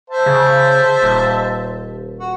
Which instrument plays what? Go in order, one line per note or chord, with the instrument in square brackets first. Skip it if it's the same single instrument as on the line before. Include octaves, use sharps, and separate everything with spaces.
[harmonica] C5 E5 A5
[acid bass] C#3
D#1
[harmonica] F#4